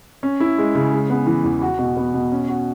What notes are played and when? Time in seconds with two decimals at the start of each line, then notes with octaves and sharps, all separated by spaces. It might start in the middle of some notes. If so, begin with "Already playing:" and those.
0.23 C#4
0.40 E4
0.58 G#3
0.75 C#3
0.92 G#3
1.10 B3
1.27 E3
1.44 E2
1.62 F#4
1.79 B2
1.97 B3
2.14 B2
2.32 C#4
2.49 F#4